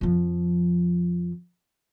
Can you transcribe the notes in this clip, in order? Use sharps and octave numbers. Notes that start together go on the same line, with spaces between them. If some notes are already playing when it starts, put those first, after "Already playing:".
F2 F3